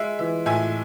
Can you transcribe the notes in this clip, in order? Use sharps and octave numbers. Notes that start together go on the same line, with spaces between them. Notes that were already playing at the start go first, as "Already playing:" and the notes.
Already playing: G#3 E5
E3 E5
A2 E5 G#5